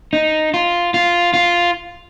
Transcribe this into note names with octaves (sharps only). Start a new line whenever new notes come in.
D#4
F4
F4
F4